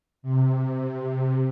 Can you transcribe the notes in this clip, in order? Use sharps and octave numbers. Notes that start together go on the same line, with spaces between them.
C3